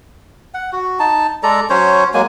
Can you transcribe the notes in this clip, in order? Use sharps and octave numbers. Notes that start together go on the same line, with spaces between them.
F#5
F#4
D#4 A5
G#3 A4 D5 A#5
F#3 C#4 C5 C#5
F#3 G#3 A#3 G#5